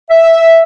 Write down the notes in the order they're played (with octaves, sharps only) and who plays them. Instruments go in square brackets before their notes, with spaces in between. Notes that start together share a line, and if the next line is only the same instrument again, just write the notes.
[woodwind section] E5